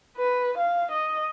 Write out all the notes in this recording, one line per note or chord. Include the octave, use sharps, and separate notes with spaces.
B4
F5
D#5